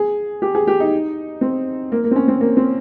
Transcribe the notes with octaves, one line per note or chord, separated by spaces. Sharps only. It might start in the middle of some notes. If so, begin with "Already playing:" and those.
Already playing: G#4
G4
G#4
G4
D#4
C4
A#3
A#3
C4
C#4
C4
A#3
C4